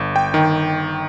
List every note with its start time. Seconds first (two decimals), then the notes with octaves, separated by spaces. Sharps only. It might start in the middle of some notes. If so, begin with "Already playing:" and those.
Already playing: G1
0.16 G5
0.34 D#3